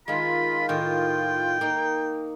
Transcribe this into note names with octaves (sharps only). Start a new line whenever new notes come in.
D#3 G#3 F4 B5
A2 D#3 G5
A#3 D#4